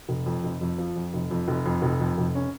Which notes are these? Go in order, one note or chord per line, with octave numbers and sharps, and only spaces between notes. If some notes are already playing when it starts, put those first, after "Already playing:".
F1
F2
F1
F2
F3
F2
F1
F2
F1
F2
F1
F2
F1
C#4